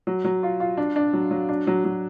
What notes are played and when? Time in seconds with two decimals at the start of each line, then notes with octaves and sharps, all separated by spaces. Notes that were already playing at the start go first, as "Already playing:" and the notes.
0.07 F#3
0.24 F#3
0.43 F4
0.60 F4
0.77 D4
0.96 D4
1.13 F#3
1.31 F#3
1.49 D4
1.67 F#3
1.85 F#3